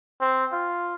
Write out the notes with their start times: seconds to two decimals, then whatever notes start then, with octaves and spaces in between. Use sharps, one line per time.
0.21 C4
0.52 F4